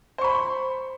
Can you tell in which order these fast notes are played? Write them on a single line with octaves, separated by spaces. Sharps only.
C5 C#6 B5